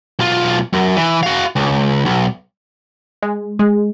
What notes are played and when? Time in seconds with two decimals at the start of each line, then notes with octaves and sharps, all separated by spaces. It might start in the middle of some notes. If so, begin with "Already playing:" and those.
0.19 B1 F4
0.73 F#2
0.96 E3
1.23 F#4 F5
1.56 C#2
2.05 B1
3.22 G#3
3.59 G#3